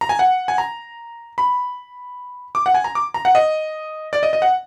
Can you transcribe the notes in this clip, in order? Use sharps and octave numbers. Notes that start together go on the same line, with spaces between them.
A#5
G#5
F#5
G#5
A#5
B5
D6
F#5
G#5
A#5
D6
A#5
F#5
D#5
D5
D#5
D#5
F#5